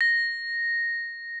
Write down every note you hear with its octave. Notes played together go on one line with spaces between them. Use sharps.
A#6